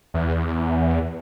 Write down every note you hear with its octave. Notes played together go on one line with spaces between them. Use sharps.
E2